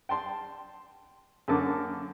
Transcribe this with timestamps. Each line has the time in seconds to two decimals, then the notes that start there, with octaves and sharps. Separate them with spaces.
0.09 G5 A5 C6
1.48 F#2 D3 A#3 A4 A5 D6